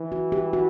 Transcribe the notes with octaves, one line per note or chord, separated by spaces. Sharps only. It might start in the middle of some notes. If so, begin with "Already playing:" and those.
Already playing: E3
F#4
G4
F#4